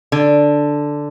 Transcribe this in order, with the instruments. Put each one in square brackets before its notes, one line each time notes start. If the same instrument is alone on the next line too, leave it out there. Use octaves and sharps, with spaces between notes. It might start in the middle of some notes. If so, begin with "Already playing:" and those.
[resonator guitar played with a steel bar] D3